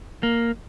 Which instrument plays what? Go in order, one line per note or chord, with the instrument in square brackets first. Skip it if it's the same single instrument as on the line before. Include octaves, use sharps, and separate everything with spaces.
[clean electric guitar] A#3